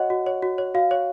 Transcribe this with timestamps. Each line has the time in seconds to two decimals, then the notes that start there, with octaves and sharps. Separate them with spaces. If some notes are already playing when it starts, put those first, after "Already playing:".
Already playing: F#4 C#5 D#5 F#5
0.10 F#4
0.26 C#5
0.42 F#4
0.58 C#5
0.75 F#4 F5
0.91 C#5